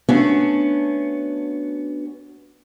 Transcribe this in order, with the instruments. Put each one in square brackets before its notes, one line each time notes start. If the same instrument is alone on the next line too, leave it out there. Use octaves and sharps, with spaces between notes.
[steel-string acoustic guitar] A3 B3 C#4 D4 F#4